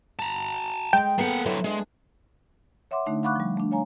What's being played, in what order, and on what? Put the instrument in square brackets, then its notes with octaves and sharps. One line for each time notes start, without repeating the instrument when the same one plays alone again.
[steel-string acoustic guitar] F#4 [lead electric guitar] A5 A#5
[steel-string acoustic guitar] G#3 [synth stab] G5
[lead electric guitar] A#3 F#5 [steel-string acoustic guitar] B3 G#4 A4
[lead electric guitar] D3 F#3 [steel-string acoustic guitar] B3 E4 C5
[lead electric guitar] G#3 [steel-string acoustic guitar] D4 G#4
[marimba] C#5 E5 F#5 C6 D6
D3 A3 D4 D#4
F5 F#5 B5 C#6 D6 F#6
F3 G3
A3 D4
C#5 F5 G#5 A#5